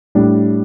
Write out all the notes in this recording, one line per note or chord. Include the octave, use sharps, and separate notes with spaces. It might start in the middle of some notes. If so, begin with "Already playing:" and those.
A2 G3 D4